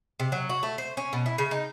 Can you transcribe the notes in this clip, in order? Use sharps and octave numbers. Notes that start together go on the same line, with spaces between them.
C3
F#3
F#4
A3
C5
C#4
B2
E4
C#3
D#4